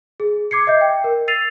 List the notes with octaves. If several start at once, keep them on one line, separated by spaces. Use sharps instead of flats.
G#4
D6 G#6 C7 C#7
D#5 E5 G6
G5
A#4
E6 A6 C7 D#7 F7